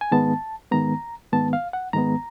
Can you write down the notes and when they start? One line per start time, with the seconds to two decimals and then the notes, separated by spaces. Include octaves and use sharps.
0.01 G#5
0.11 G#2 D#3 G#3 B3 A5
0.72 G#2 D#3 G#3 B3 A#5
1.32 G#2 D#3 G#3 B3 A5
1.53 F5
1.73 F#5
1.93 G#2 D#3 G#3 B3 A#5